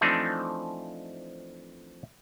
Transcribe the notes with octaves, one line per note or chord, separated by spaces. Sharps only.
E3 F3 A3 C4 D4 D#4